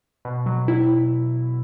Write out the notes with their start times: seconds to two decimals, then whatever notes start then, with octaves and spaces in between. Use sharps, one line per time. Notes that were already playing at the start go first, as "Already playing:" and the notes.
0.25 B2
0.46 F#3
0.68 E4